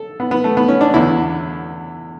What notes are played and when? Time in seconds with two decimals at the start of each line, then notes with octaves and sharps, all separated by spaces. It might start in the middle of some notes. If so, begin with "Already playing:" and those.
Already playing: A4
0.20 B3
0.31 B3
0.44 A3
0.57 B3
0.68 C#4
0.81 D4
0.94 E2 D3 E4